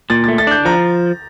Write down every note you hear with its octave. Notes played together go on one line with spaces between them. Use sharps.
A#2 A6
A3 A6
A6
D4 G6
F3 A#5